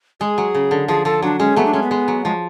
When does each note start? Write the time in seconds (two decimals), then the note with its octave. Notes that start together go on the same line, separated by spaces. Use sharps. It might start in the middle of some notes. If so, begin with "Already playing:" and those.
0.20 G#3 G#4
0.38 F#3
0.55 C#3
0.71 D3
0.88 F3 G#4
1.05 F3 A4
1.23 F#3 D4
1.39 G#3 C#4
1.56 F#3 A3 B3
1.65 D4
1.73 G#3 C#4
1.82 B3
1.91 G#3
2.08 F#3
2.25 F3 G#3